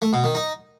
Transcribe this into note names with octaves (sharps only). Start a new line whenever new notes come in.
A3
B2
D#3
D#4